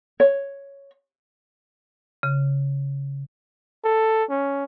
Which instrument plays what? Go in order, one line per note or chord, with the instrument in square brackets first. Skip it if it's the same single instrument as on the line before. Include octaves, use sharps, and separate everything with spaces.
[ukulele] C#5
[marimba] C#3
[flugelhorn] A4
C#4